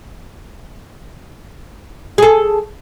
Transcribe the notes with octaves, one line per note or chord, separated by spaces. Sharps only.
G#4 A4